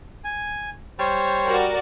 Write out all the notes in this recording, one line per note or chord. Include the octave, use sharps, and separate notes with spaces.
G#5
G3 C5 C#5
F#4 A#4 D5